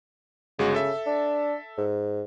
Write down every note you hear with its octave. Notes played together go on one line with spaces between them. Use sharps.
G1 C#3 G#3 F#4
A4 E5
D4
G#2